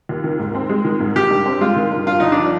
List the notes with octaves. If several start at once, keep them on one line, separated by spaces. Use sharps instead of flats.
D#2
D#3
G#2
C4
G#3
D#3
G#2
D#3 G4
G2
C4
G#3 F4
D#3
G2
G2 F4
G1 D#4
F3 D4